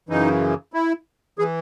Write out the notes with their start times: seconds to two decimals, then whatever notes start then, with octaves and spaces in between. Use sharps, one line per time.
0.09 F#2 C#3 E3 D#4
0.73 E4
1.39 E3 G#4